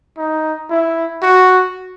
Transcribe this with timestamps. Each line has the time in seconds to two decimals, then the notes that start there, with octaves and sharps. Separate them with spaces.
0.17 D#4
0.70 E4
1.22 F#4